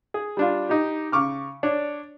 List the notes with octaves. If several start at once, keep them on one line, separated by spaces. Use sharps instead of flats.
G#4
G3 D4 F4
D#4 G4
C#3 C#6 D6 F6
D4 C#5 D5